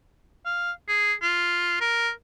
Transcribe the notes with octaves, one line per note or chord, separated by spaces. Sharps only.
F5
G#4
F4
A#4